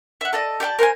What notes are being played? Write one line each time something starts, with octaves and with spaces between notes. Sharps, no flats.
E5 F#5
A4 D5 D#5
G4 D5 G5 A5
A#4 C5 F#5 G#5